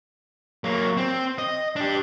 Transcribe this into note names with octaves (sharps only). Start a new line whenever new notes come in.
F#3 A#3
C4
D#5
D4 G4